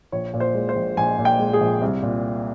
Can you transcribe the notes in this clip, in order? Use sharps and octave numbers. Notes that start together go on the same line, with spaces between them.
A#1 C#5
A#2
C5
G#3
C5
A#1
A#1 G#5
A#2
G5
G#3
G#4
A#1
C2
A#2